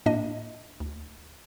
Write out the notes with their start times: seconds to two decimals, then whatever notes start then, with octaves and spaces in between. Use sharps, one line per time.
0.06 A2 A#3 D4 D#5
0.80 D2